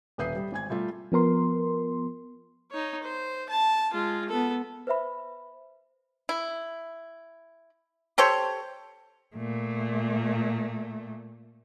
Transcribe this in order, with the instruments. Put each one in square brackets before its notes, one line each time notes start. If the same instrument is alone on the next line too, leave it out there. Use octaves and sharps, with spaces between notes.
[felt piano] D#1 B4 E5 D#6 G6 C7
G3
G#1 G#5 G#6
G3 A3 F4 G4
[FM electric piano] F3 B3 A#4 C6
[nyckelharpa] D#4 C#5
C5
A5
G#3 F4
B3 A4
[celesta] B4 C5 E5 B5
[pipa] E4
G4 A4 C5 C#5
[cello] A#2 A3